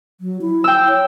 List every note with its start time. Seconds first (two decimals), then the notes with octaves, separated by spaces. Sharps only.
0.21 F#3
0.41 E4
0.64 G5 E6
0.89 C#5